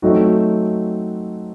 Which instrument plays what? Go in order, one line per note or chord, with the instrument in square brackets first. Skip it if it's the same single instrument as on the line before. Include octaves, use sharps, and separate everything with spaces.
[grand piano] F#3 A3 C4 D#4 F#4